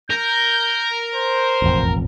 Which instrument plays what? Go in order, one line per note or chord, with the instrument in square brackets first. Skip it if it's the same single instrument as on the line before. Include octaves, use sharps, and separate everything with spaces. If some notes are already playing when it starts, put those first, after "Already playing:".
[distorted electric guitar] A#4 [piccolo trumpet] G6
[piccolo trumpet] C5
[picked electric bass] E1 A1 F2